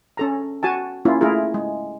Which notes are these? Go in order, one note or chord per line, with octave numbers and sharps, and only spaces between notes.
C#4 A4 A#5
F#4 G#5 A5
A#3 C#4 E4 F4
A3 E4 F4 G#4 A#4
G#3